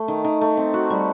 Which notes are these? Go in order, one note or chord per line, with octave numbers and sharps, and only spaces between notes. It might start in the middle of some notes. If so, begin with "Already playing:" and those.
Already playing: A3
D#3
D#3
A3
C4
F#4
G3